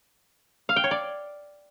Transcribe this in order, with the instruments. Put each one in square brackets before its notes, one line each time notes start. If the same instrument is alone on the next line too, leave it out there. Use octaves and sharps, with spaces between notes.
[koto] F5
G5
C#5
D5